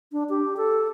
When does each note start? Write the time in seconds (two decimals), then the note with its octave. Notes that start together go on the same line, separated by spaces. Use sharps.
0.12 D4
0.29 G4
0.57 A4